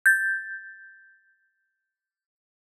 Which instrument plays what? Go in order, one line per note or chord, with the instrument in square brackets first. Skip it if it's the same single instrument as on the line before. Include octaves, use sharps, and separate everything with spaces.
[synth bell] G6 A6